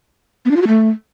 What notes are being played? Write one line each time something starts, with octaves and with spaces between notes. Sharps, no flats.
B3
D4
F4
F#4
A3